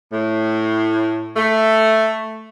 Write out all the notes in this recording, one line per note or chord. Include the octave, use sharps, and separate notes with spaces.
A2
A3